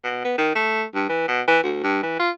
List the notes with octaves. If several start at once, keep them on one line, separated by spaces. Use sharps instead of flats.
B2
B3
D#3
A3
G2
E3
B2
E3
D2
G2
E3
F4